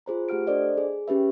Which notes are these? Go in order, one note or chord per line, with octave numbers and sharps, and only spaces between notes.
F4 G#4 C5 A#5
A3 G4 F#5 F6 D7
D4 A4 C5 D5 D#5
G#4
C#4 G4 B4 E5